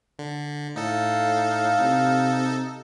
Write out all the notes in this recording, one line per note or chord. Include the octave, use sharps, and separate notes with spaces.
D3
A2 D#4 A4 F5
C3